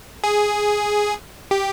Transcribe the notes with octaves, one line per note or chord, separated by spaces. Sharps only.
G#4
G4